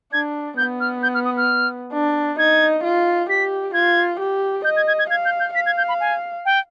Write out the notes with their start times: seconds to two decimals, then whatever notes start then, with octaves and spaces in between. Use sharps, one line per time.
0.13 D4 G#6
0.57 B3 G6
0.80 F6
1.03 G6
1.15 F6
1.25 D#6
1.37 F6
1.93 D4
2.39 D#4 G#6
2.84 F4
3.30 G4 B6
3.74 F4 G#6
4.20 G4
4.65 D#5 G6
4.77 G#6
4.88 G#6
4.99 G#6
5.10 F5 G#6
5.25 G6
5.40 G6
5.55 F5 B6
5.66 G#6
5.78 G6
5.89 B5
6.00 G#5
6.45 G5